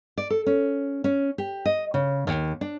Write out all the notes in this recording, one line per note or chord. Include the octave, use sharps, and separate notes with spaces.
D5
A4
C#4
C#4
G4
D#5
C#3
D#2
D4